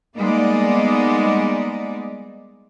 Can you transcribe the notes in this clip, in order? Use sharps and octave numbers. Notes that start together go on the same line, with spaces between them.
G3 G#3 A#3 B3 D#4 D5